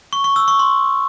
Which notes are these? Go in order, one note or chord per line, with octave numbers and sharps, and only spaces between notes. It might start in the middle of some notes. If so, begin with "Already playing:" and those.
C#6
C#6
E6
C#6
C6